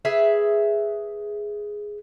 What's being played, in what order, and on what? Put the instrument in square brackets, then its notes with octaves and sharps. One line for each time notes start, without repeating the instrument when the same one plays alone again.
[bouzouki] G#4 B4 E5